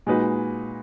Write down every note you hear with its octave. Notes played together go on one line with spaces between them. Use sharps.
A#2 G#3 D#4 F#4 B4